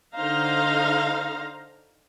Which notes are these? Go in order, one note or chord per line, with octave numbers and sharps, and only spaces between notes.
D3 D#4 C5 F5 A#5